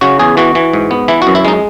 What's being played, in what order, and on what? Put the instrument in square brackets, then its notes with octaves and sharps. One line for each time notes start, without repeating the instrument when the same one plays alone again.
[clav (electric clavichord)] C#3 F#4
E2 G#4
E3 F#4
E3
G#2
B3
E3 E4
F#4
F#2
E4
G#3 D#4